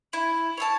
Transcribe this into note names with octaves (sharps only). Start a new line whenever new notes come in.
E4
C#5 E5 A5